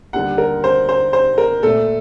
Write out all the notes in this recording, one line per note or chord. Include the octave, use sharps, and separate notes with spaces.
D#2 D3 G3 F#5
A#4
C5
C5
C5
A#4
A#2 A3 A4